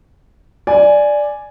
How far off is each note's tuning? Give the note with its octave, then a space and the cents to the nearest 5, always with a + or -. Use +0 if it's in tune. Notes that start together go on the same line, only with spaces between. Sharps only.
D5 +0 G#5 +0